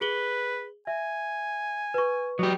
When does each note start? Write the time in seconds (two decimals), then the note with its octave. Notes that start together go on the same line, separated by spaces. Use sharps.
0.01 G#4 B4 F#7 G7
0.87 E5 G#5
1.94 B4 C#6
2.39 F#3 G4 D#5